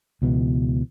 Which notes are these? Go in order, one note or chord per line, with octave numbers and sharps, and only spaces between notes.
C#2 B2 E3